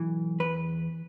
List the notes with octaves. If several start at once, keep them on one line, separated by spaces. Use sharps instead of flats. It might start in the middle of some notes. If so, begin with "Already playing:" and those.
Already playing: B1 E3
E2 B4